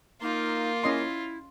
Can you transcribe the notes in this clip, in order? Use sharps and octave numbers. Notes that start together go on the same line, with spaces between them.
A#3 D#4 F4
C#4 E4 D#5 C6